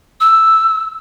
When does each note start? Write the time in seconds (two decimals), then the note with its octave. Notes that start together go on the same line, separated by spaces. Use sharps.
0.20 E6